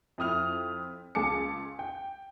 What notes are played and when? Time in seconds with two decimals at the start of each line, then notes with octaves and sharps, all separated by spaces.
0.18 F2 E4 D#6 F6 F7
1.15 C#2 G#4 A5 D6 C#7
1.79 G5